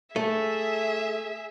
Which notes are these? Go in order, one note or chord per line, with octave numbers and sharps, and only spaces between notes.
A3 G#4 E5